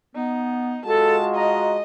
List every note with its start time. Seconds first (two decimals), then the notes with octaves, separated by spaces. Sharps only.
0.15 B3 D#4
0.87 G#3 F4 F#4 A4 A5
1.36 D#5 A#5